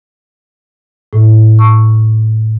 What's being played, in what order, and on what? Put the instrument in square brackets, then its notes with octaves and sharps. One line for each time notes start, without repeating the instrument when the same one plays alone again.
[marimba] A2
C#6